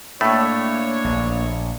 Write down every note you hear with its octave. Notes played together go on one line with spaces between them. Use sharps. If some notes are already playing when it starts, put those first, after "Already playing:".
A2 A3 A#3 D4 C#5
A#1